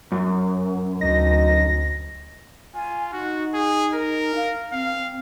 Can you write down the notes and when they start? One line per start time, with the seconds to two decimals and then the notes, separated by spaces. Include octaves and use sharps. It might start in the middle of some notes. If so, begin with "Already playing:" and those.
0.12 F#2
1.01 D2 D#4 A#6
2.75 F4 G#5
3.13 D#4 F#4
3.54 G#4
3.94 A#4
4.35 F5
4.72 C4 F5